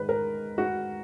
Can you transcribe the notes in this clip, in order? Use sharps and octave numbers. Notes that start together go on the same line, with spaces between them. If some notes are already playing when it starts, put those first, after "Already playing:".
Already playing: G#2 D#3 B4
A#4
F#4